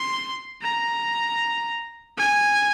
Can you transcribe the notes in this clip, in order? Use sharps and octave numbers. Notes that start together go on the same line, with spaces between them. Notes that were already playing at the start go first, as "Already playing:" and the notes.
Already playing: C6
A#5
G#5